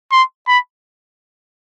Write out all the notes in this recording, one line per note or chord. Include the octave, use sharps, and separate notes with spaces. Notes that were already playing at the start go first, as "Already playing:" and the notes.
C6
B5